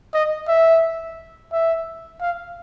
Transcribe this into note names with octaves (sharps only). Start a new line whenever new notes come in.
D#5
E5
E5
F5